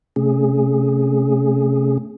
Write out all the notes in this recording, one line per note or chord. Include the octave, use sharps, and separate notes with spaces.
C3 A3 C#4 G#4